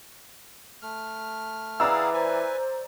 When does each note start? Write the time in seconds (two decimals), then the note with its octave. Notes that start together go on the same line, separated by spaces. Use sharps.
0.82 A3 F6
1.80 E3 G#4 D5 F5 F#5 A#5 E6
2.14 B4 C5 G#5